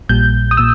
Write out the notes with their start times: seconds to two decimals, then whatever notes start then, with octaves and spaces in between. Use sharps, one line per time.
0.09 A#1 A#2 G3 G6
0.51 D#6
0.57 A#2 E6